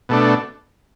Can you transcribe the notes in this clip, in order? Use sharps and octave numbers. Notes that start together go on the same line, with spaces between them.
B2 A3 D4